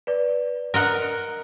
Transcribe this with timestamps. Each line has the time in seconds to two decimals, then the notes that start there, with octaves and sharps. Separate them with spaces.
0.07 B4 D5
0.74 A#4 D#5 F#5